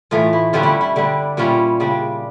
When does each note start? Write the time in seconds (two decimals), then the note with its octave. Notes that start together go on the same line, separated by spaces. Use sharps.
0.11 A2 E3 A3 F4
0.33 E4
0.53 G2 D3 G3 C#4 F4
0.63 E4
0.81 E4
0.96 D3 G3 D4
1.37 A#2 G3 C#4 E4 F4
1.80 C#3 G3 D4